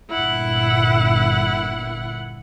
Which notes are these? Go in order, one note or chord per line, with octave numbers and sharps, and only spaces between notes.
G1 A#2 E4 F#5